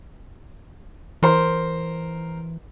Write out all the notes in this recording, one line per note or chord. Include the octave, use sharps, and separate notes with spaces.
E3 A#4 C5